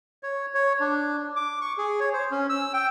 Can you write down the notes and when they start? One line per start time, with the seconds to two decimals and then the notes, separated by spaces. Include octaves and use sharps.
0.23 C#5
0.54 C#5
0.80 D4
1.36 D6
1.61 C#6
1.78 G#4
2.00 C#5
2.13 C5
2.31 C#4
2.49 E6
2.73 G5